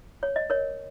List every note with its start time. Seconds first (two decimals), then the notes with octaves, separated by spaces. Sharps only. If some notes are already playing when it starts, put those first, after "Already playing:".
0.23 C#5
0.36 D#5
0.50 A#4 C#5